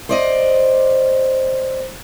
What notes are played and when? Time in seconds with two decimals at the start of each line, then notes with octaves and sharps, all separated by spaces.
0.09 C5 D5 D#5